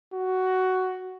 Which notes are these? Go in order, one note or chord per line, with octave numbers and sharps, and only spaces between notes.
F#4